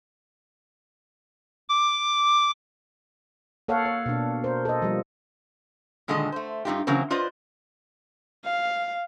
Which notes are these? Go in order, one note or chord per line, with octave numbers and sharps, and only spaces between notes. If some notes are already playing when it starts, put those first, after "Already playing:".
D6
A#3 A4 C#5 F5 F#5
C#5
B2 D4
A#4 C5
A4 D#5
F3 G3
A#2 D3 D#3 G#3 A4 D#5
A3 C5
G2 C3 D#4 F4 G4
C#3 E3 F#3 A#3 C4
F4 B4 C5 D5 D#5
F5